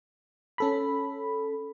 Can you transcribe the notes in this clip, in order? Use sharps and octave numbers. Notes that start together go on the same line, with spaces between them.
C#4 A4 B5